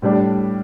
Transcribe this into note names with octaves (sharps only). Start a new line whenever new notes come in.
A2 G3 D4